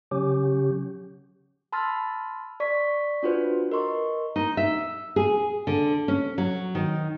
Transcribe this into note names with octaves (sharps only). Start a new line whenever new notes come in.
C#3 F#3 C#4 G4
A5 B5 C6 E6 F6 A6
D5 C#6 B6
D4 F4 F#4 B4 C5
A#4 D#5 C6 C#6
D#4
E5
G#4
D3
C#4
F#3
D#3